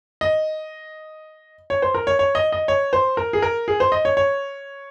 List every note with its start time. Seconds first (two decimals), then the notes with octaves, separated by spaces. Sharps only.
0.21 D#5
1.70 C#5
1.82 C5
1.94 A#4
2.07 C#5
2.19 C#5
2.35 D#5
2.52 D#5
2.68 C#5
2.93 C5
3.17 A#4
3.33 G#4
3.42 A#4
3.68 G#4
3.80 C5
3.92 D#5
4.05 C#5
4.17 C#5